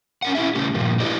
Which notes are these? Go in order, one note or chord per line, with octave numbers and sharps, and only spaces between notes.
C#4 A#4 F#5
C#4 E4 G4 E5
C#3 A3 C#4 G4
G2 A#2 F3
E4 F#4 G4 B4 D5 D#5